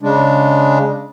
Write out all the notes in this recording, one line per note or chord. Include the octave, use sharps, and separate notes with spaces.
C#3 G#3 D4